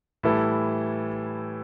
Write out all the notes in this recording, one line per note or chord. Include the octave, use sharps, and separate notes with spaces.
A2 E3 G3 E4 A4